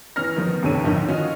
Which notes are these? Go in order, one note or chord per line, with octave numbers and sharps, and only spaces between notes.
E3 C#4 F6 A#6
D#3 F3 B3
D#2 C3 D4 A4 C#5 D#7
A1 D3 D#3 F3
C#4 F4 F#4 D#5